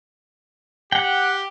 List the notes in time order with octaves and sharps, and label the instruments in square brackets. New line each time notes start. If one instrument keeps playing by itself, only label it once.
[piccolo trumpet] G4 [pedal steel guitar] F#5 G5